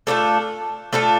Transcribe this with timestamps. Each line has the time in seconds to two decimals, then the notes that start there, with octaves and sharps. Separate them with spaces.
0.07 A3 D4 F4 A4
0.93 A3 D4 F4 A4